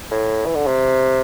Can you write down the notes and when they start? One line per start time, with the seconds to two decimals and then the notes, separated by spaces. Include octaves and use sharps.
0.11 A2
0.46 E3
0.56 D3
0.67 C3